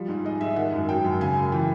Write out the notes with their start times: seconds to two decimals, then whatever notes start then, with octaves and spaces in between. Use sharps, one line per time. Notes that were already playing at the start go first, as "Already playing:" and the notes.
Already playing: F3 G3
0.08 G#2
0.24 G#3 D#5
0.41 G#2 E5
0.56 D#3 F#5
0.72 F#2
0.89 F#3 G5
1.05 F#2
1.21 C#3 G#5
1.37 F#2
1.52 E3 G5